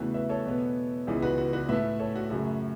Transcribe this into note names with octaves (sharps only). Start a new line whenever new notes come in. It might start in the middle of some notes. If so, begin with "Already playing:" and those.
Already playing: E2 C#3 E3 A3 F#4 B4
B4 E5
A4 C#5
E2 B2 B3
C#2 C#3 E3 B3
F#4 B4
F#4
F#4 B4
A2 A3 B4 E5
A4 C#5
F#4
F#2 C#3 A3 F#4